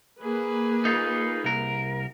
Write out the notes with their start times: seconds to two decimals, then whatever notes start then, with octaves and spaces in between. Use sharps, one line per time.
0.19 A#3 G#4 B4
0.85 D#4 F4
1.44 C2 A#4